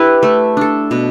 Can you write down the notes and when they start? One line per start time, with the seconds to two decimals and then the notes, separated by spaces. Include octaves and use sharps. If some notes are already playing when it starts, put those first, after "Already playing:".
Already playing: D4 E4 G4 B4
0.23 A3
0.57 D4 A4
0.91 B2